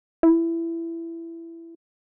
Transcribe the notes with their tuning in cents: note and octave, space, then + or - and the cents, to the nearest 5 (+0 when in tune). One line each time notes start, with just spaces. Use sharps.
E4 +15